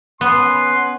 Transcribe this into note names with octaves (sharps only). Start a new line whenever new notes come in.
B3 C#4 B4 C6